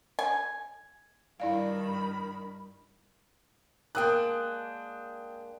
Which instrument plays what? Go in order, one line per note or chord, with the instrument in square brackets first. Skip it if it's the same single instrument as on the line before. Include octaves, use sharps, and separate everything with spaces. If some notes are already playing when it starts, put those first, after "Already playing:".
[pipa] G#5
[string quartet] G2 D#3 B5 [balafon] E4 D5 F5
[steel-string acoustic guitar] G#3 A#3 D4 [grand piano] G5 D#6 F#6